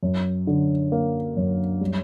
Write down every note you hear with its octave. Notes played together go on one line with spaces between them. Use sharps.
F#2
D3
A#3
F#2
G3